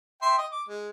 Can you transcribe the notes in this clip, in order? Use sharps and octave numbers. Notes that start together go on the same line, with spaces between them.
E5 G5 C6
D#5 D#6
D6
G#3